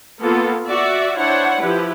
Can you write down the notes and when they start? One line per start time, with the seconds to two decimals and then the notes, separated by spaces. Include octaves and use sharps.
0.20 A#3 B3 F4 A4
0.65 F#4 D5 E5
1.16 D4 E4 C5 C#5 F#5
1.59 F3 E4 G4 B4